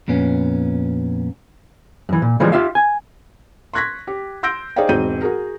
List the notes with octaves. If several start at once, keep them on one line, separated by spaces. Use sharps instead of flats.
F2 A#2 B3 C#4
F#2 E3
A#2
C#3 E3 F3 G3 G#3
F4 G4 E5 F5
G#5
C6 C#6 F#6 G#6 A#6 B6
G4
C6 E6 G6 A#6 D7
D#4 G#4 C5 D5 F5 G5
E1 G#2 C4 F#4 G6 D#7
F#4 G#4 A#4